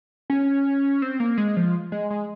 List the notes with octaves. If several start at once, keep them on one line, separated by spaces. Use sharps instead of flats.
C#4
C4
A#3
G#3
F3
G#3
G#3